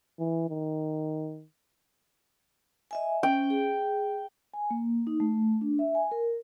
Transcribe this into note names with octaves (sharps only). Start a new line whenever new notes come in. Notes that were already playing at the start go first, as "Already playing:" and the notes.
E3
D#3
D#5 E5 G#5
C#4 G5
G#4
G#5
A#3
D#4
A3
D4
E5
G#5
A#4